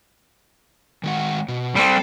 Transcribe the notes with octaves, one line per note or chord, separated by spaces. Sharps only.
D#3 G#3 F#5
B2
G3 C4 A4